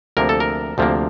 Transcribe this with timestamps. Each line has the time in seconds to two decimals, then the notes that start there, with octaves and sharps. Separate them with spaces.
0.17 D2 C3 F3 A#3 A#4
0.29 A4
0.40 A#4
0.78 D2 C3 F3 A#3